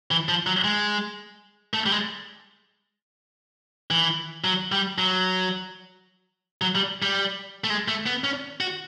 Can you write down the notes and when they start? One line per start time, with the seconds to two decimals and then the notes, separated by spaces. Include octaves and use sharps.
0.11 E3
0.29 F3
0.47 F#3
0.64 G#3
1.74 A3
1.86 G3
1.91 G#3
3.91 E3
4.44 F#3
4.72 G3
4.98 F#3
6.62 F#3
6.75 G3
7.02 G3
7.64 A3
7.70 G#3
7.88 A3
8.06 B3
8.24 C#4
8.60 F#4